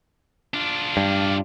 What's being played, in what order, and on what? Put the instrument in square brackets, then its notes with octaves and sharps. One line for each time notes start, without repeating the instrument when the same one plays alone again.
[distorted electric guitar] D4 F4
[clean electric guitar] G2